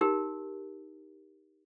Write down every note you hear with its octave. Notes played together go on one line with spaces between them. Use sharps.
D#4 G4 A#4